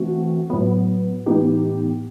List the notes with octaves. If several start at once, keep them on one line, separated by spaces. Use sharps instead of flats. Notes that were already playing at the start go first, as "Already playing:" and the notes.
Already playing: E3 A3 C4 F#4
A2 F#3 B3
A2 E3 B3 D#4 G4